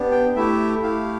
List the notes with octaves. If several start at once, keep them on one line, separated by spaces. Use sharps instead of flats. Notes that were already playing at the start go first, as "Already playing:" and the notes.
Already playing: B3 D4 G4
G5
A3 E4 G4 E5
A3 E4 G4 F5